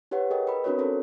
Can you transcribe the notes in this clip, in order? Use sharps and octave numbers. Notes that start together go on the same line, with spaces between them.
E4 G4 B4 C#5 F#5
G#4 A#4 D#5 G5
B4 B5
C4 D4 E4 F#4 A#4 C#5
C#4 A4 A#4 C5